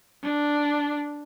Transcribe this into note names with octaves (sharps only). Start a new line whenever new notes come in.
D4